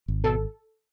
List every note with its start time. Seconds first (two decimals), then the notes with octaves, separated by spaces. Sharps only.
0.08 G#1
0.24 B2 A4